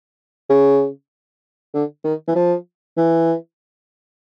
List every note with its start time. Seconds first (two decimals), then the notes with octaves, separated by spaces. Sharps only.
0.50 C#3
1.74 D3
2.04 D#3
2.27 E3
2.35 F3
2.97 E3